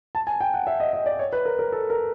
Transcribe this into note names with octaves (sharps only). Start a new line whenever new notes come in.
A5
G#5
G5
F#5
E5
D#5
D#5
D5
C#5
B4
A#4
A#4
A4
A#4